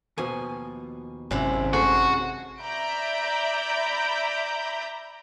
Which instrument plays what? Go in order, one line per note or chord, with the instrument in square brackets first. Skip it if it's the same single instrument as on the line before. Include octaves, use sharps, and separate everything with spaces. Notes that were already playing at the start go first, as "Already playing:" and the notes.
[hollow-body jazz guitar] D#2 B2 F3 [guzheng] G#5
[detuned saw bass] G#1 [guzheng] F#2 C3 E4
[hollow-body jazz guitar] A3 A4 C5 [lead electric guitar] F#4 [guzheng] G#4
[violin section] D5 E5 A#5 B5 G6 D7